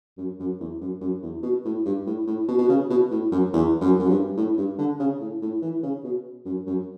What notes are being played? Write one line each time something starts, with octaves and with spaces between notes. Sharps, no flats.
F#2
F#2
E2
F#2
F#2
E2
B2
A2
G2
A2
A2
B2
B2
C#3
B2
A2
F#2
E2
F#2
F#2
G2
A2
G2
D3
C#3
A2
A2
E3
C#3
B2
F#2
F#2